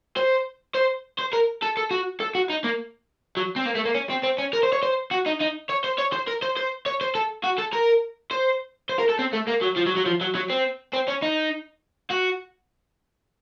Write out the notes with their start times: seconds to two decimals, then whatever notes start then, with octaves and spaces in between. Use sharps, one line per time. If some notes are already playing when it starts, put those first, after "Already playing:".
0.16 C5
0.75 C5
1.19 C5
1.33 A#4
1.62 A4
1.77 A4
1.91 F#4
2.20 A4
2.35 F#4
2.50 D#4
2.64 A#3
3.37 F#3
3.56 C4
3.65 A#3
3.75 A3
3.85 A#3
3.95 C#4
4.10 C4
4.24 C4
4.38 C#4
4.53 A#4
4.63 C5
4.72 C#5
4.83 C5
5.11 F#4
5.26 D#4
5.40 D#4
5.69 C#5
5.84 C5
5.99 C#5
6.13 C5
6.28 A#4
6.42 C5
6.57 C5
6.86 C#5
7.01 C5
7.15 A4
7.44 F#4
7.59 A4
7.73 A#4
8.31 C5
8.89 C5
8.99 A#4
9.09 A4
9.19 C4
9.33 A3
9.48 A#3
9.63 F#3
9.77 F3
9.87 F#3
9.97 F#3
10.06 F3
10.21 F#3
10.35 F#3
10.50 C4
10.93 C4
11.08 C#4
11.22 D#4
12.10 F#4